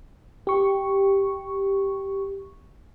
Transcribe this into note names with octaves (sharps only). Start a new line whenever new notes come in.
G4 C#6